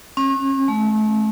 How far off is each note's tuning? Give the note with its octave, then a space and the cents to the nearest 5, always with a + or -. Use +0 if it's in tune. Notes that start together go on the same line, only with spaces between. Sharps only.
C#4 -40
A3 -35